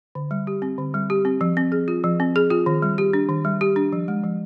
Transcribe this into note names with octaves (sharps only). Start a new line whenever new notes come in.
D3
G3
G4
C4
D3
G3
G4
C4
F3
C4
G#4
F4
F3
C4
G#4
F4
D#3
G3
G4
D4
D#3
G3
G4
D4
F3
G#3
F3